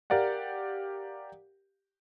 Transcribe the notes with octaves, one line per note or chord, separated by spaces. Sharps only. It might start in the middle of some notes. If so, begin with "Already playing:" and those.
G4 A#4 D5 F5 F#5